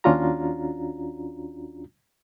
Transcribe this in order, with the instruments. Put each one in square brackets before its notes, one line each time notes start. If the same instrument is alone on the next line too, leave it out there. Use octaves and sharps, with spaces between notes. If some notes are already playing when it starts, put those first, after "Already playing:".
[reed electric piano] D#2 C#4 D4 F4 F#4 A#5